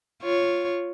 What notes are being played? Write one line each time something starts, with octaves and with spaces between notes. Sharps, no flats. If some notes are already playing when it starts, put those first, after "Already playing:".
F4 C#5